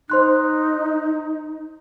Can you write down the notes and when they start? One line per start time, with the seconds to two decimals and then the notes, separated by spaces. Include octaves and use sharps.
0.10 D#4 C5 C6 F#6